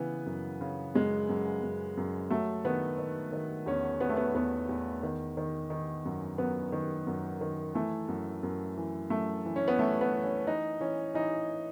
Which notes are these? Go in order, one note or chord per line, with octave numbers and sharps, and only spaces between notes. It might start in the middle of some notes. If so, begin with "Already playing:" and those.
Already playing: C#3 E3 B3
F#2
C#3
F#2 G#3
F#2
F#2
F#2
F#3 A3
D#3 B3
D#3
D#3
E2 C#4
E2 B3
A3
B3
E2 B3
E2
D#3
D#3
D#3
F#2
F#2 B3
D#3
F#2
D#3
E3 A3
F#2
F#2
E3
F#2 A3
E3
C#4
B3
E3 A3
B3
E3
C#4
E3 D#4
E3 C#4
E3 D#4